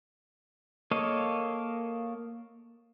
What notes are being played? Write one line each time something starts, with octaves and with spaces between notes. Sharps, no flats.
A#3 A4 C#5 D#5 F5